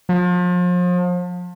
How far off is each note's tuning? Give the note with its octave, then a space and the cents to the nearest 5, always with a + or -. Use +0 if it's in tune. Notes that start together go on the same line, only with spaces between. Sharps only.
F3 +35